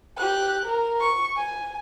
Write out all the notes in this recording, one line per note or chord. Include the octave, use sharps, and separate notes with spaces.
G4 F#6
A#4
C#6
G#5